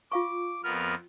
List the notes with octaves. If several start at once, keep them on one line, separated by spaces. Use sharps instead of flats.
F4 F5 C#6 D6
F2 B3 A#4 F6